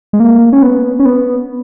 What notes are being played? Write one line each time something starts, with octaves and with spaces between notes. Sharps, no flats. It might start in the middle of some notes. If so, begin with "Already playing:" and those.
G#3
A#3
C#4
B3
C#4
B3